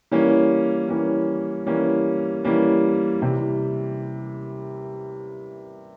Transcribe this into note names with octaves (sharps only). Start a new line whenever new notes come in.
E3 G3 A#3 C#4
E3 G3 A#3 C#4
E3 G3 A#3 C#4
E3 G3 A#3 C#4
C3 E3 G3